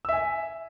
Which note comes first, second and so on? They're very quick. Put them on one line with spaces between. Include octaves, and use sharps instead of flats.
E6 E5 G#5